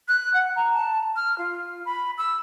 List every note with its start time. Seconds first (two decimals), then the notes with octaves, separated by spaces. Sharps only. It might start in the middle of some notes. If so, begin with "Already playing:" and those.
0.08 F#6
0.34 F#5
0.56 A#5
0.74 A5
1.16 F6
1.38 F4
1.85 B5
2.18 E6